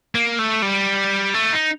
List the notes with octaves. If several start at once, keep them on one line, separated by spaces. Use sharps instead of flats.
A#3
A3
G3
A3
D#4